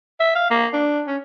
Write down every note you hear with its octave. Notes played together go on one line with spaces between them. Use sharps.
E5
F5
A#3
D4
C#4